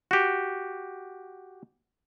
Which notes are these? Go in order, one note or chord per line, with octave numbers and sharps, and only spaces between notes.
F#4 G4